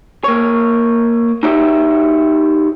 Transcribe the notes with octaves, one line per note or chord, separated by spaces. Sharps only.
A#3 C#5
D#4 F#4 G4 C#5 E5